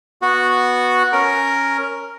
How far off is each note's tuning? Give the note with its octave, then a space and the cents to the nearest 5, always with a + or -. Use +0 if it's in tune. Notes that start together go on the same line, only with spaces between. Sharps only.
B3 -5 F#4 -5
C#4 +0 A#4 +0